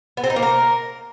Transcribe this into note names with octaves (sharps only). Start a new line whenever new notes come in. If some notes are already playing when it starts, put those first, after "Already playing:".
B3
C4
D#4
A#3
A#4